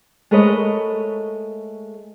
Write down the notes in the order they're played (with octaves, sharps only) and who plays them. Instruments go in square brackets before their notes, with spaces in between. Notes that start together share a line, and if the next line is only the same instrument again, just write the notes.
[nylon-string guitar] G#3 A3 A#4 B4 C#5 D#5